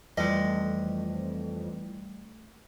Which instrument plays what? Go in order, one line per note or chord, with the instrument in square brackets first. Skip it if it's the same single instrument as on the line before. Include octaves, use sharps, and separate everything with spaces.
[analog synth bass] F2 [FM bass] E3 [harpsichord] G3 [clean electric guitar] A3 D#5